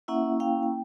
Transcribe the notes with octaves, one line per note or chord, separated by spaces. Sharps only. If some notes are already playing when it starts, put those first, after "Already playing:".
A#3 C#4 E4 E5 F#5
F5 G5
G5